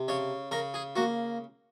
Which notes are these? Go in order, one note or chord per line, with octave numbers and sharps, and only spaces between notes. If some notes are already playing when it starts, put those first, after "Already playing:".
Already playing: C3
C#3 C#5
C#3 A#4
G#4
A#3 F#4